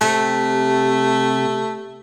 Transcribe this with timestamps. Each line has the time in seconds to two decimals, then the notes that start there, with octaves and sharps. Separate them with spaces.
0.01 C3 A3